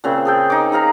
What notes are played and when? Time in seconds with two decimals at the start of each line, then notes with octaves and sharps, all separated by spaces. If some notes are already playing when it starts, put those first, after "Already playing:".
0.04 A#2 C#3 C4
0.25 G#4 A4 G5
0.50 D#4 D6
0.72 D#4 G#4 F5 A#5